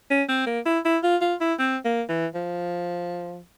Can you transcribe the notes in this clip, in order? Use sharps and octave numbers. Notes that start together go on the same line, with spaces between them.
C#4
C4
A#3
E4
E4
F4
F4
E4
C4
A#3
E3
F3